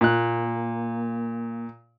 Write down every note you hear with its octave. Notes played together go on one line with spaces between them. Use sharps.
A#2 A#3 F#6